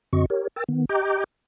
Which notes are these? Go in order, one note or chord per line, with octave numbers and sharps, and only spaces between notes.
F#2 D3 C4 F#4 D#5 C#6
G4 A#4 C#5
A#4 G5 E6 A6
D#3 B3
G4 D#5 G5 A#5 D6 G6